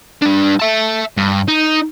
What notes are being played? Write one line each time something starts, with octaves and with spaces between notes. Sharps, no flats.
G3 D4
E5 A5
G2
D#4